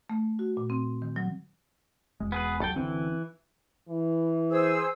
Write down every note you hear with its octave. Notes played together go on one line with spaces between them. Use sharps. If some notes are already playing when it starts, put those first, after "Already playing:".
A3
F#4
A#2
C4
D#3
F#3
E1 G#3
B3 G#4 B4
D#2 F#3 A4 G5
F#1 D3 E3 C4
E3
G#4 C5 E6